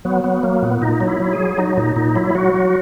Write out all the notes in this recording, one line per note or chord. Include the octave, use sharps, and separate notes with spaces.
F#3 B3
F#3 B3
F#3 A#3
A#2 B3
A#2 D#4
F#3
E4
F#3
G#4
F#3
F#3 D#4
A#2 D#4
A#2 D#4
F#3 E4
F#3 F#4
F#3